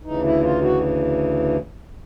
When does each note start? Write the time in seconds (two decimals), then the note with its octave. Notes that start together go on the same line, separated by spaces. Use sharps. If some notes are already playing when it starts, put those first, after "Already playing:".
0.04 D2 C#3 E3 D#4
0.23 E4
0.42 F4
0.61 F#4